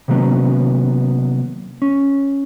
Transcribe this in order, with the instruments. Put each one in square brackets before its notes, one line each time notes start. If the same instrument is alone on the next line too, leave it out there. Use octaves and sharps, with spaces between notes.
[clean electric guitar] C3 D#3 F#3 A#3 B3 C#4
C#4